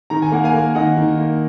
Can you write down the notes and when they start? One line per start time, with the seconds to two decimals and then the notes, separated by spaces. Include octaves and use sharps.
0.10 D#3 A#5
0.22 G#5
0.32 A#3 F#5
0.44 F5 G#5
0.54 A#3
0.75 D#3 D#5 F#5
0.97 D#3
1.19 A#3